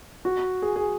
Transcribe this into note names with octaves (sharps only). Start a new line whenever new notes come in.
F#4
G#4
G#4